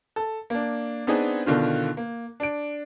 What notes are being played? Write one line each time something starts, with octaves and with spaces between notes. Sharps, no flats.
A4
A#3 D4
B3 C4 D4 D#4 G#4
B2 D3 D#3 F4
A#3
D4 D7